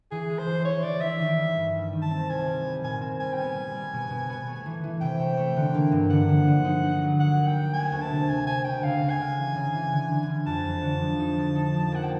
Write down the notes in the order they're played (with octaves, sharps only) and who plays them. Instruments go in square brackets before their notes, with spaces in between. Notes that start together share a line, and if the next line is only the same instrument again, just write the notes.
[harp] E3 [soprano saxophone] G#4
[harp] G#3
[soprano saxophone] C5
[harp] E3
[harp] E4 [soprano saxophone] C#5
[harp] E3 [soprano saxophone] D5
[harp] E4 [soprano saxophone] E5
[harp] D#3
G3
G2
G3
D#3
[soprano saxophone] A5
[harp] C4
[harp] C2 [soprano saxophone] G#5
[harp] G3
G3
[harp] A#2 [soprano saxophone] G#5
[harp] C4
[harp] G3 [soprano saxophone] G#5
[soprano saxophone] G5
[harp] B3 [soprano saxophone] G#5
[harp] G3
G3
B2
B2
B3
A3
E3
E3
[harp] C3 [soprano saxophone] G5
[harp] A3
A3
D3
A#3
G2
[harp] D3 [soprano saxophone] F#5
[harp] F3
D3
D#4
D#4
F#3
[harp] A#3 [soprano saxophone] F#5
[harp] F#3
[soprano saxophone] G5
[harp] A#3
[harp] A3 [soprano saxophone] G#5
[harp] D2
[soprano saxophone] A5
[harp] C3
[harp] C3 [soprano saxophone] G#5
[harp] A3 [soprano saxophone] G#5
[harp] D2 [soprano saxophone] G5
[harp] C#3 [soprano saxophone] F5
[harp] C#3
[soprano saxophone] G#5
[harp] G#3
E3
C#3
E3
D3
D3
G3
[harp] F2 [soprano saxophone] A5
[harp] F2
D3
F3
D#4
F3
D#4
F3
[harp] A#3 [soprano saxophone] F#5
[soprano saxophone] G5